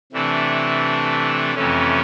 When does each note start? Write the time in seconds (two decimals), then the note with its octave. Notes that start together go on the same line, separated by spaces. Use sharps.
0.13 C3 E3 A3 D4
1.55 F2 C3 E3 A3 C#4